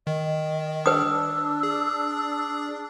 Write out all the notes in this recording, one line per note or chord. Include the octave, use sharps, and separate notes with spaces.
D#3 D#5
D4 B4 D#6 E6
G#4